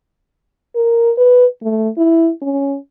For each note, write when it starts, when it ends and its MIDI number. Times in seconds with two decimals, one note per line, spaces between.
0.75 1.12 70
1.18 1.46 71
1.63 1.89 57
1.97 2.31 64
2.42 2.77 61